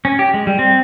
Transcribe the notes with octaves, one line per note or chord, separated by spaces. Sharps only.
C#4
G4
G#3
G3
C4